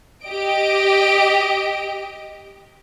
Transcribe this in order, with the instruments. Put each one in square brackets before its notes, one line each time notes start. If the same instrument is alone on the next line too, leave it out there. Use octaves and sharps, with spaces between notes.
[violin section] G4 D#5 D7